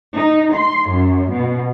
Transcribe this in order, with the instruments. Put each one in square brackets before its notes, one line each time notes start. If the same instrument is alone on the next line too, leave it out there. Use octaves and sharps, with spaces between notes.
[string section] D#4
C6
F#2
B2